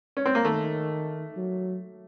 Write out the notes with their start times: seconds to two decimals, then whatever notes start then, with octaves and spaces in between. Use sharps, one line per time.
0.17 C#4
0.26 C4
0.35 A#3
0.44 D#3 A3
1.36 F#3